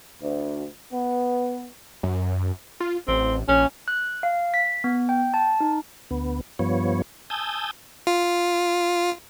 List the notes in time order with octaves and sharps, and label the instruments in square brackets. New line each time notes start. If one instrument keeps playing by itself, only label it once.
[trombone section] D2
B3
[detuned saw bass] F#2
F4
[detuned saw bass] A1 [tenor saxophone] C4
[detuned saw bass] A#1 [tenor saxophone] C#4
[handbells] F#6
F5
B6
B3
G5
A5
D#4
[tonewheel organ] D2 B3
G2 F3 B3 C#5
G#5 A5 D#6 E6 G6
[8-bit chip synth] F4